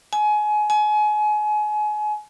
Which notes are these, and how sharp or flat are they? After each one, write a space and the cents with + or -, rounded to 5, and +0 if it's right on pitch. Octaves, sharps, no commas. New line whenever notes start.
G#5 +25
G#5 +30